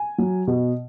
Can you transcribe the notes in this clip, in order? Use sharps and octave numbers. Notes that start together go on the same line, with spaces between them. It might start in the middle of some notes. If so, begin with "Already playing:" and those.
Already playing: G#5
F#3
B2